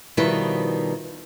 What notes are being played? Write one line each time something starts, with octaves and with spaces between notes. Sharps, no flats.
B2 D#3 F3 G3 E4 B4